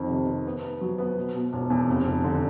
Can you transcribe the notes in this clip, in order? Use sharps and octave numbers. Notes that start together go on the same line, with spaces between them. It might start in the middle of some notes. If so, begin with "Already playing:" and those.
Already playing: F2 D#3
C3
C3
B3
B3
F#3
B3
B2
B2
E1
E2
F1
F1
D3